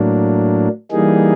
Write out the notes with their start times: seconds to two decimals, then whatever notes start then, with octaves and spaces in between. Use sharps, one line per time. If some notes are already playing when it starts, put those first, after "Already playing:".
Already playing: A2 F#3 A#3 D4
0.92 E3 G3 A#3 D#4 G#4